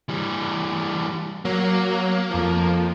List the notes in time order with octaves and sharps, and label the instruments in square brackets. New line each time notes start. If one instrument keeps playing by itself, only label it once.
[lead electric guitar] E3 G3
[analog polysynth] F#3 [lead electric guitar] A#3
[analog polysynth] F2 F3